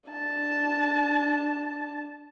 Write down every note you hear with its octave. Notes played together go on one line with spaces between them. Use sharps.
D4 A5